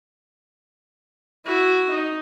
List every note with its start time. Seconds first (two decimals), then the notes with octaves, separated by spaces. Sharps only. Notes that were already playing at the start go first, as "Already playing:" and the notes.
1.46 E4 F#4
1.89 D#4